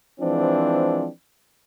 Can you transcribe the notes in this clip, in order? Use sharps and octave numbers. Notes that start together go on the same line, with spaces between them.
E3 F3 G#3 C4 D4